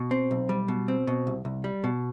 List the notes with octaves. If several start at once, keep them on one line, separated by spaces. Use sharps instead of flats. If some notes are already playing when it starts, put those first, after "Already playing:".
Already playing: B2
C4
B1
G3
B2
C4
B2
C2
C2
G3
B2